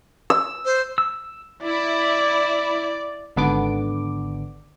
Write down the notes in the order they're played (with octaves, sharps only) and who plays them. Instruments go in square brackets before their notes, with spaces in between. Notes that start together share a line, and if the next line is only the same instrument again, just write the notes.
[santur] E6
[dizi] C5
[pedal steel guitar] E6
[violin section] E4 [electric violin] D5
[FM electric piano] G#1 D3 B3 D4 D6